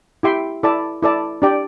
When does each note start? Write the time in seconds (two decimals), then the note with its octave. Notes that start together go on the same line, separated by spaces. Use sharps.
0.23 E4 G4 E5 G5 C6
0.63 E4 A4 D5 A5
1.03 E4 A4 D5 A5
1.42 D4 G4 D5 G5